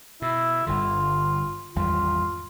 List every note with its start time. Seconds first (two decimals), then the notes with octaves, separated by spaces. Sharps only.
0.22 B2 E4
0.67 G1 G2 D3 F4
1.76 G#1 E2 G3 F4